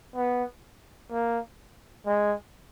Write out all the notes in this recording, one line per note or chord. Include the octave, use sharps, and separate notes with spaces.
B3
A#3
G#3